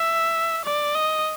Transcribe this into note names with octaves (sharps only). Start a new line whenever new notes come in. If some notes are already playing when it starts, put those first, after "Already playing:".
Already playing: E5
D5
D#5